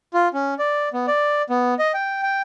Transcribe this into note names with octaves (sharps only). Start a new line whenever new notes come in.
F4
C#4
D5
B3
D5
B3
D#5
G5
G5